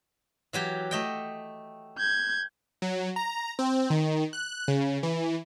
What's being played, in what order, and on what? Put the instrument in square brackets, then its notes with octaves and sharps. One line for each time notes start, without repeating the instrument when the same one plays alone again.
[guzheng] E3 F#3 G4
A3 D#5 G5
[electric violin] G6 G#6
[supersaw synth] F#3
A#5
C4
D#3
F#6
C#3
E3